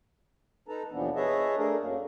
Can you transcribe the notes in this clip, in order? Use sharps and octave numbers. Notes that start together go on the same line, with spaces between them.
D#4 A4 B4 A5 A#5
D#2 B2 E3 F3 B3 D4
G#4 B4 C#5 D#5 E5 A5
A3 D4 G#4 A#4
F#2 F#3 A#3